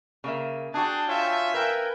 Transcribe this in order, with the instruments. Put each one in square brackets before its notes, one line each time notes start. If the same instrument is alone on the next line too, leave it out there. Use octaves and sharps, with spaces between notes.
[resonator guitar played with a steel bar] C#3 A#3 E5
[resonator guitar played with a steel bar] D4 F#4 [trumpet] G#4 [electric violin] G5 A5
[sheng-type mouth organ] F4 C#5 G#5 [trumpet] E5
[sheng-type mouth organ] A#4 B4 [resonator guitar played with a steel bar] F5 [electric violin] G5 G#5